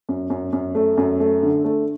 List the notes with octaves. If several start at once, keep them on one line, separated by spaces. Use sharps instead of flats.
F#2
F#2
F#2
A3
F#2
A3
D3
A3